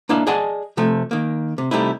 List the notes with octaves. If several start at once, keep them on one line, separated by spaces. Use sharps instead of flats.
A#3 D4 E4 D#5 F5
G#4 D5 D#5 F#5 G#5 A5
C3 F3 A3
D#3 A#3
C3
C3 G3 A3 D#4 E4